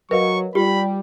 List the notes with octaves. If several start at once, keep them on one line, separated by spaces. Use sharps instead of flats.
F#3 A#4 B4 D#5 F5 C#6
G3 F4 G4 B5